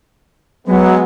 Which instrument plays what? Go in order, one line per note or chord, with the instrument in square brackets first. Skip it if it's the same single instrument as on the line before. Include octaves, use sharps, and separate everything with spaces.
[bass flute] F#3 [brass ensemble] G#3 B3